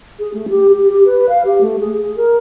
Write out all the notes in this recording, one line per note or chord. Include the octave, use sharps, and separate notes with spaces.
G#4
A3
G4
G4
G4
B4
F5
G4
A3
G#4
G#4
A#4